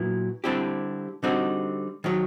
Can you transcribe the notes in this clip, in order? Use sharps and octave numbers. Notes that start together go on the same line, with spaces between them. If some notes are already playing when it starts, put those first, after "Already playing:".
Already playing: A#2 F#3 B3 E4
D3 G3 C4 E4 G4
D3 G3 C4 D#4 F#4
D#3 F#3